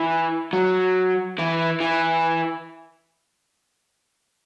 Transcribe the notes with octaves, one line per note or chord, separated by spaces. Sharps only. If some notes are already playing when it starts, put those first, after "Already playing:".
Already playing: E3
F#3
E3
E3